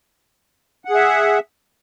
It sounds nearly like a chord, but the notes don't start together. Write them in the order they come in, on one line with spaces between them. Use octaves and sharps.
F#5 G#4 E5